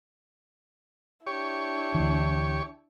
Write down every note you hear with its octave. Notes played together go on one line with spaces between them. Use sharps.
D4 E4 G4 C#5 C#6
D2 E3